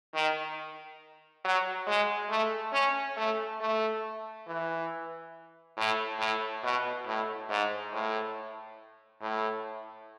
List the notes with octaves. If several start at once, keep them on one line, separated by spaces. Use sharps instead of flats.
D#3
F#3
G#3
A3
C#4
A3
A3
E3
A2
A2
B2
A2
G#2
A2
A2